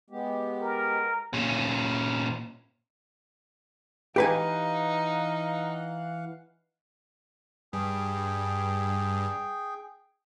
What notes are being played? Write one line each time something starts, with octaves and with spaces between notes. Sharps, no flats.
G#3 B3 G4
A#4
A#2 C#4
E3 D#4 G4 B4 F5 F#5 G#5
G2 G#4 G5